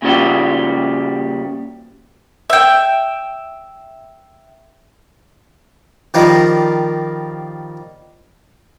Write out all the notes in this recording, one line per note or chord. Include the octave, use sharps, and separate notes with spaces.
A#2 C#3 F3 G3 F#4 G4
E5 G5
D#3 F3 G3 A#3